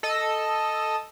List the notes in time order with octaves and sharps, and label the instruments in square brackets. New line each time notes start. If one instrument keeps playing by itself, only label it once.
[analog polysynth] A4 D#5 E6